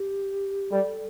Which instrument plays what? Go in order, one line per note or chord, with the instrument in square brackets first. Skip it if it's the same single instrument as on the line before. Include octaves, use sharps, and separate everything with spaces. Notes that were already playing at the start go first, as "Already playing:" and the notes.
Already playing: [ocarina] G4
[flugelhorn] G3 [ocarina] A4